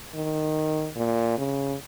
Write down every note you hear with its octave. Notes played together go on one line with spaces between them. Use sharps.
D#3
A#2
C#3